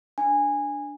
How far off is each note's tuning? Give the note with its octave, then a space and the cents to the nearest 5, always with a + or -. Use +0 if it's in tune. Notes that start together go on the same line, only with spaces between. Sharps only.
D4 +0 G#5 -15